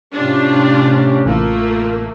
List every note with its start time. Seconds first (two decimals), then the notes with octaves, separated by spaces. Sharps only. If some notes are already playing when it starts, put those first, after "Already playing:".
0.14 A2 C3 C#4 D4 F4 G4
1.26 A1 A3 A#3 F4 A#4